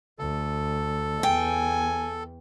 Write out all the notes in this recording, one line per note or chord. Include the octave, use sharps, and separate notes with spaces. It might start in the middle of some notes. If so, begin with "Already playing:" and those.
D2 A4
E2 G5 G#5